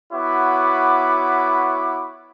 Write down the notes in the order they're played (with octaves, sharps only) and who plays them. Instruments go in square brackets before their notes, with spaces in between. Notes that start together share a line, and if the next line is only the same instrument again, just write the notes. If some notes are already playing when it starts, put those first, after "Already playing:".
[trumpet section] B3 E4 F#4 C#5 B5 D6